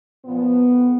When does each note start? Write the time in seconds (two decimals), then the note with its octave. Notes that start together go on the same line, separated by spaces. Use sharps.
0.24 A#2 F3 B3
0.68 F2